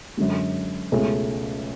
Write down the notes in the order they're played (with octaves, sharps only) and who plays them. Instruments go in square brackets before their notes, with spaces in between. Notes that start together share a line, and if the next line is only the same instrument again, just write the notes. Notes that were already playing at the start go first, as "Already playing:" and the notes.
[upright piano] F#2 D3 G#3
C#2 B2 A3 C#4 G#4